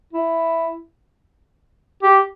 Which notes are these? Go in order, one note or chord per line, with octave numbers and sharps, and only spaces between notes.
E4
G4